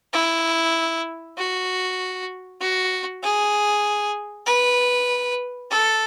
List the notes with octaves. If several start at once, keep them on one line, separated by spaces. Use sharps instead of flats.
E4
F#4
F#4
G#4
B4
A4